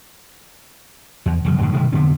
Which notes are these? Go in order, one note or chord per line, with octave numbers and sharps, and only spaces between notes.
E2
E1 F#2 C#3
F#2 A2 D3
B2 D#3 G3 A3
F2 D3 B3 C4